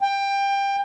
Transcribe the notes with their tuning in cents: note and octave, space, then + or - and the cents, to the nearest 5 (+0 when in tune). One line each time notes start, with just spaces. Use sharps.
G5 +20